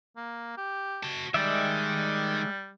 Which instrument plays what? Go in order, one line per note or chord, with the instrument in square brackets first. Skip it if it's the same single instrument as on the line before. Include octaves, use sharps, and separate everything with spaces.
[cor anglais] A#3
G4
[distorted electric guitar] F#4 A5
[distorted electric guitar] D#3 [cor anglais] G3 [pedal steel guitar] G#3 D5 E5